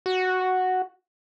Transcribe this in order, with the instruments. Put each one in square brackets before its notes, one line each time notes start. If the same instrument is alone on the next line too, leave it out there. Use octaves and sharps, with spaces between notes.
[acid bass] F#4